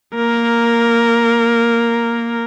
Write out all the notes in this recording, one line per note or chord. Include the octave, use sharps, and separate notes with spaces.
A#3 A#4